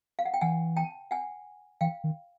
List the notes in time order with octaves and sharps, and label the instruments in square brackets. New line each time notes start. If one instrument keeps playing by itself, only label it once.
[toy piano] F5
F#5
G5
[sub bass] E3 [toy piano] F#5 G#5
[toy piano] G5 A5
F#5 G#5
[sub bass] E3 [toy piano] F5 G5
[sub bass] D#3